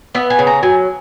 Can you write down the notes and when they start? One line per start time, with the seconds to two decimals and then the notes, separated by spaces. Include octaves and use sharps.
0.15 B3 E5
0.30 G#5
0.39 C#3
0.47 A#5
0.63 F#3 G#5